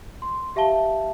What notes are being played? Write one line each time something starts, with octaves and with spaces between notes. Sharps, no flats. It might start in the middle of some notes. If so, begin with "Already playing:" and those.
C6
G4 E5 F5 A5 G7